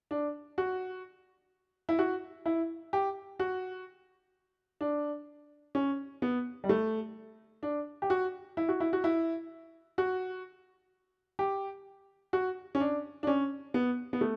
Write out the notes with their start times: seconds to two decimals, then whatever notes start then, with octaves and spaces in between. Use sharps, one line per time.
0.11 D4
0.58 F#4
1.89 E4
1.99 F#4
2.46 E4
2.93 G4
3.39 F#4
4.81 D4
5.75 C#4
6.22 B3
6.64 G3
6.69 A3
7.63 D4
8.02 G4
8.10 F#4
8.57 E4
8.68 F#4
8.80 E4
8.93 F#4
9.04 E4
9.98 F#4
11.39 G4
12.33 F#4
12.75 C#4
12.80 D4
13.23 D4
13.27 C#4
13.74 B3
14.13 B3
14.21 A3